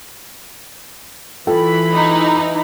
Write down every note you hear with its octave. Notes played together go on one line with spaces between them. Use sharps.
E3 F4 A4 G5 B5
D#4